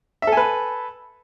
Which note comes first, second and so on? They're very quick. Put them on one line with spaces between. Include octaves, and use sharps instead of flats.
E5 A4 G#5 B4